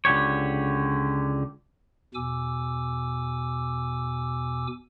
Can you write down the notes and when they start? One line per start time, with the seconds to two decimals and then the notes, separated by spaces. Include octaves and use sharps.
0.05 C#2 D3 G4 C#5
2.15 E2 B2 G#5 D6 E6